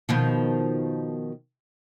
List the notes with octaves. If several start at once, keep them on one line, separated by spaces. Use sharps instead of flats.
B2 D#3 F3